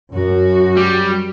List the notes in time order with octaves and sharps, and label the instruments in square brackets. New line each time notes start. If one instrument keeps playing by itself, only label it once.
[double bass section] F#2 [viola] F#4
[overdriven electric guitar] G3